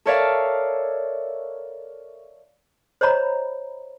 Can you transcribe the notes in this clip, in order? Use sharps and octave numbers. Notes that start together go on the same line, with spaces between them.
A4 A#4 C#5 D5 E5 F5
C5 C#5 D#5 A#5 B5